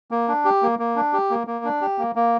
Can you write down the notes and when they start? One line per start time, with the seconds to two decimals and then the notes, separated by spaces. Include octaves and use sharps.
0.11 A#3
0.28 D4
0.45 G4
0.62 A#3
0.79 A#3
0.96 D4
1.13 G4
1.30 A#3
1.47 A#3
1.65 D4
1.81 G4
1.98 A#3
2.15 A#3